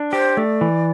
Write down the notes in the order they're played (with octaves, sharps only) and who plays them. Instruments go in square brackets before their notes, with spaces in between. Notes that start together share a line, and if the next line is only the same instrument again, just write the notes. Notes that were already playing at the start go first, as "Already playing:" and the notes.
Already playing: [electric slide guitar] D4
[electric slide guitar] G4 [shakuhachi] C5
[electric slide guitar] A3 [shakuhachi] D5
[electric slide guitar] E3